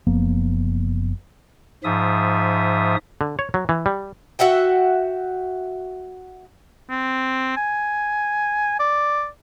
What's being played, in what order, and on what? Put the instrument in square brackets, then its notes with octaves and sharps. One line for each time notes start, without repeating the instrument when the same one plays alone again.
[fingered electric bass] F#1 F3 A#3 B3
[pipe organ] G#2 F3 E5 D#6
[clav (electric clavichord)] D3
C#5
F#3
E3
G3
[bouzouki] F#4 E5 F#5 G5
[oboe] C4
G#5
D5